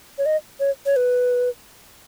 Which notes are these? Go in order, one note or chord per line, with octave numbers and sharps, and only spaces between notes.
C#5
D#5
C#5
C#5
B4